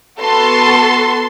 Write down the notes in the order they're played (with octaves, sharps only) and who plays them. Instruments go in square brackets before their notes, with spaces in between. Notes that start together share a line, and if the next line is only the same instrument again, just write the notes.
[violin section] B3 F#4 A4 A5 C6